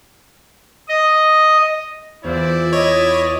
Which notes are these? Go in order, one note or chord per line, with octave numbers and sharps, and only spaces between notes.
D#5
E2 E3 E4 F4 C5 D5
C#5 D#5